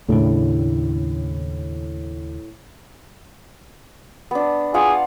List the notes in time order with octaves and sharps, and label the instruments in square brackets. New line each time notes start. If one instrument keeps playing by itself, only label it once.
[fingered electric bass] D#2 C#3 D4 [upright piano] A2 E4
[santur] B3 D4
[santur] F4 F5 F#5 [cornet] G#4